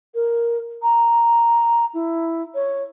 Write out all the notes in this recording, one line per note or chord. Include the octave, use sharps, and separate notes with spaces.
A#4
A#5
E4
C#5